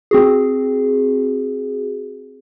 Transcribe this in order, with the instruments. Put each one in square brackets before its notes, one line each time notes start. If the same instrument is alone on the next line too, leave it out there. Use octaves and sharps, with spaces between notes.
[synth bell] C4 F#4 G#4